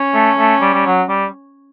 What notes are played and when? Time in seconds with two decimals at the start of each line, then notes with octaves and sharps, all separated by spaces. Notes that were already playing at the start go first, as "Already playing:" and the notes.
Already playing: C#4
0.14 A3
0.39 A3
0.61 G3
0.74 G3
0.86 F#3
1.09 G3